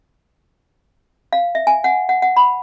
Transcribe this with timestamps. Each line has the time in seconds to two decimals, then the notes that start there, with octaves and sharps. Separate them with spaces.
1.33 F5
1.55 E5
1.67 G#5
1.84 F#5
2.09 F#5
2.22 F#5
2.36 B5